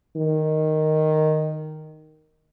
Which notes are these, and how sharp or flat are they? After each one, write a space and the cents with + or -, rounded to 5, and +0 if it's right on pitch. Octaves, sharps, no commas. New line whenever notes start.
D#3 -5